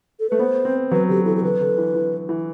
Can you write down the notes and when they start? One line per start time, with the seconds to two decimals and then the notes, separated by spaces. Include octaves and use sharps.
0.20 A4
0.30 A3 B4
0.39 B3 C5
0.65 C4
0.91 F#3 B4
1.09 D3 G4
1.26 E3 A4
1.37 A4
1.43 D3 B4
1.61 D3
1.78 E3
1.95 E3
2.29 E3